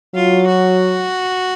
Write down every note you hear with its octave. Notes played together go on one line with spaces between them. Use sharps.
F#3 F4
F#4